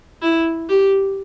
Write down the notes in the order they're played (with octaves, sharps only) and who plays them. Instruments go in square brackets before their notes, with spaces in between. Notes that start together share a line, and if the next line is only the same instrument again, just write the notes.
[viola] E4
G4